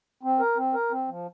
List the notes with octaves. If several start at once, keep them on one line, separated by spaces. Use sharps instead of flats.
C4
A#4
C4
A#4
C4
F3